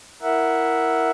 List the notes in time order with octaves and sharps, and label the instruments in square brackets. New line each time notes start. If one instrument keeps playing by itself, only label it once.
[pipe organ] E4 A#4 E5 F#5